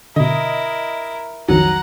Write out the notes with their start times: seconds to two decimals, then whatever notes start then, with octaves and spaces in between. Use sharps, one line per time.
0.16 B2 D3 E4 A#4 D#5
1.49 B1 F2 D#3 F#3 F#5 A#5